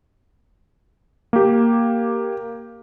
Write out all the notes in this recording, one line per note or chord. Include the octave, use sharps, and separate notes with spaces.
A#3 G4